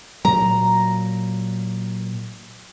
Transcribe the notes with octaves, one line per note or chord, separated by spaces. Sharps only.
A#2 F#3 A#5